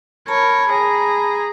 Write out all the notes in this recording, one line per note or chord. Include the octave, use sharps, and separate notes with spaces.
A#4 C#5 A5 B5
G#4 A#5